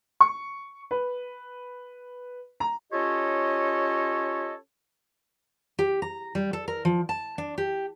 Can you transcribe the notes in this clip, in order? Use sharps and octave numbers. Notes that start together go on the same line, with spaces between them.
C#6
B4
A#5
C#4 F4 G4 A4 C#5 D#5
G4
A#5
G3
A4
A#4
F3
A5
D4
G4